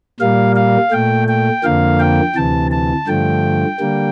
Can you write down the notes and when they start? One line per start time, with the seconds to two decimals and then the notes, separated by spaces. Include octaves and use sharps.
0.20 A#2 G3 A#3 F5
0.56 F5
0.91 A#2 A3 G5
1.28 G5
1.63 F2 D3 F3 A#3 F5
2.00 G5
2.36 D2 C3 E3 A5
2.71 A5
3.08 G2 D3 F3 A3 G5
3.80 D3 G3 A#3